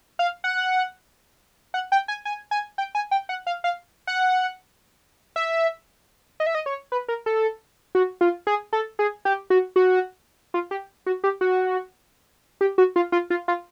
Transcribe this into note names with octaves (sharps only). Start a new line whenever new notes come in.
F5
F#5
F#5
G5
G#5
G#5
G#5
G5
G#5
G5
F#5
F5
F5
F#5
E5
D#5
E5
D#5
C#5
B4
A#4
A4
F#4
F4
G#4
A4
G#4
G4
F#4
F#4
F4
G4
F#4
G4
F#4
G4
F#4
F4
F4
F4
F4